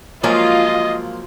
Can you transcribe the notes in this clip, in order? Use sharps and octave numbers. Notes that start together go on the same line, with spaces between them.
F3 F#3 G#3 A#3 F4 D#5